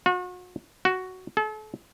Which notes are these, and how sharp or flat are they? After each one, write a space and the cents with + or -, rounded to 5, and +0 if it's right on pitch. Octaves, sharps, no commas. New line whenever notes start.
F#4 -40
F#4 +5
A4 -40